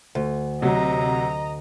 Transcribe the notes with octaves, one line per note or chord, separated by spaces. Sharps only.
D2
C3 F#3 D#5 A#5